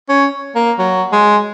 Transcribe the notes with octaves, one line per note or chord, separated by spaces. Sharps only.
C#4
A#3
F#3
G#3